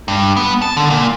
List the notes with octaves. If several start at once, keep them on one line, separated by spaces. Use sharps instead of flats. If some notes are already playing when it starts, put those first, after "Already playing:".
G2
B3
A5
D3
A#2